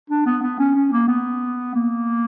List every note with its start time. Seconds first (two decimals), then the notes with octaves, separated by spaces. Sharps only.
0.10 D4
0.26 B3
0.42 B3
0.59 C#4
0.75 C#4
0.92 A#3
1.08 B3
1.75 A#3